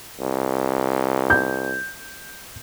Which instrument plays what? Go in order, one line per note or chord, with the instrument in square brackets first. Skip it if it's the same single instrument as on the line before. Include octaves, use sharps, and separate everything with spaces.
[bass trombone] C2
[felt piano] G6